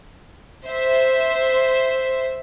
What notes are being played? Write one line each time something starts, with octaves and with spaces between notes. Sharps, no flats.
C5 E5